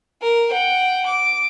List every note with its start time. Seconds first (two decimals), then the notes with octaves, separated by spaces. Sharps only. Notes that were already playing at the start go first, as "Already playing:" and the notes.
0.22 A#4
0.51 F#5 G5
1.06 D6